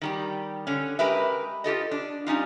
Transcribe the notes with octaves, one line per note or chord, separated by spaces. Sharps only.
D#3 G3 G4
D3 C#4
G#3 G4 A#4 B4 E5
F4 G4 A4 D#5
D4
G3 C#4 D#4 F4